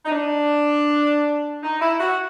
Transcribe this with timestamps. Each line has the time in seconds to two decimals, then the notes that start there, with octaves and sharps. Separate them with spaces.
0.05 D#4
0.12 D4
1.63 D#4
1.81 E4
2.00 F#4